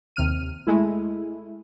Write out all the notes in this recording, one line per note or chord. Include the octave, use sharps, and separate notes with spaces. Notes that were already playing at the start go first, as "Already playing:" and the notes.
D#2 C3 F6 D#7
G#3 A3 E4